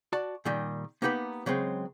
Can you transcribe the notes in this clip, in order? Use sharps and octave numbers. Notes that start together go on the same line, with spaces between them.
F#4 D5 A5
A#2 D#3 G3
A#3 B3 D#4 G4 B4
C#3 F#3 G#3 C4